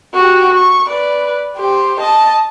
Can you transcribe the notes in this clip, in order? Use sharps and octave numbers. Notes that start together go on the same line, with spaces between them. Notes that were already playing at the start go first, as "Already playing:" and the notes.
F#4 G4
C#6
B4 D5
G4 C5
D#5 A5